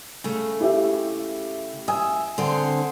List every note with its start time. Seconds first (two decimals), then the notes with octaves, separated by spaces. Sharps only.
0.24 C#3 A3
0.60 E4 G4 E5
1.88 E5 G#5 D#6
2.38 D3 C4 C5